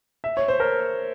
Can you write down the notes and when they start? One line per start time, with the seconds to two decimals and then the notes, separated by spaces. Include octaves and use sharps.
0.24 E5
0.37 C#5
0.48 C5
0.60 A#4